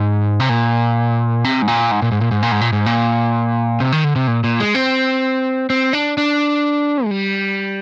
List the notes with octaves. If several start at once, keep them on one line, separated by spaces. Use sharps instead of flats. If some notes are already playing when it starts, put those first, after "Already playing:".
Already playing: G#2
C3
A#2
C3
G#2
A#2
G#2
A#2
G#2
A#2
G#2
A#2
G#2
A#2
G#2
A#2
C3
D#3
D3
C3
A#2
A#2
G#3
C4
C4
D4
D4
G#3
G3